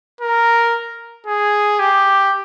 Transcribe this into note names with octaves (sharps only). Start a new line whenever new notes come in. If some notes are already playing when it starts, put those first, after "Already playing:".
A#4
G#4
G4